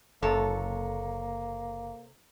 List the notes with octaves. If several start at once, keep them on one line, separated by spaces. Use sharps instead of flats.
F#1 C3 A#3 A4 C#5